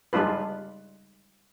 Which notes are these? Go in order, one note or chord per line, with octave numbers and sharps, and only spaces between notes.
G3 G#3 D4 F4 B4